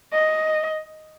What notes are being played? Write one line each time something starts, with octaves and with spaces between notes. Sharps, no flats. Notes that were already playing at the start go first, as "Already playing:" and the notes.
D#5